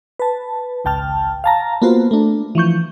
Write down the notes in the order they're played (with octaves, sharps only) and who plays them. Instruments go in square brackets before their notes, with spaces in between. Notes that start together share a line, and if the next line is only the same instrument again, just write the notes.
[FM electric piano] B4 A5
G#1 C#2 G5 A5 F6
F5 A5 A#5
A#3 B3 F4 F#4 C5
A3 D4
E3 F3 C#6 G6